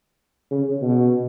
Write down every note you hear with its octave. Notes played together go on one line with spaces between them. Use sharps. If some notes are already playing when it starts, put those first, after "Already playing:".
C#3
B2